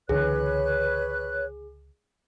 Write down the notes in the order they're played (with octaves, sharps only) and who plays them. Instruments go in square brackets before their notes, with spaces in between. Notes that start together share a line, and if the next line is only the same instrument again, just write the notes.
[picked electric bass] C#2 D3 E3 [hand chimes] G#4 [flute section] B4 C#5 F#6